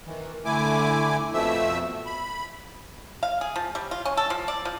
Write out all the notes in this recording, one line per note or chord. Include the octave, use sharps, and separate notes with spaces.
D#3 E3
D3 A3 E4 G#5 D6
F2 B2 F3 A3 E5 E6
B5
F5
G#4
F3
G3
F4
C#4
A4
F3
D5
F3